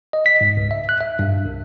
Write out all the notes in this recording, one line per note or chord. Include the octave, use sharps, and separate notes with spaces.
D#5
B6
G#2
C#2
E5
F#6
E5
G2
C2